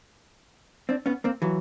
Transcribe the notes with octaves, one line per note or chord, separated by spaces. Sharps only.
C4 D4
B3 C#4
A#3 C4
E3 F#3